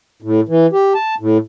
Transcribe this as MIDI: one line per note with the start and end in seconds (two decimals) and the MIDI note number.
0.22 0.41 45
0.49 0.66 52
0.73 0.93 67
0.95 1.15 81
1.20 1.38 45